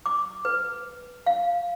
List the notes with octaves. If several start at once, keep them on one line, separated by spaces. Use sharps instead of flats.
D6
B4
F5